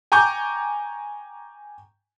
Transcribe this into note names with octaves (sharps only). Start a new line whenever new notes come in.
G5 G#5 A#5 C#6 D6 G6